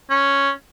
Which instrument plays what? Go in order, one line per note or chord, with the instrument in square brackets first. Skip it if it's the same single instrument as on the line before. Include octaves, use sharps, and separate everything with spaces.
[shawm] C#4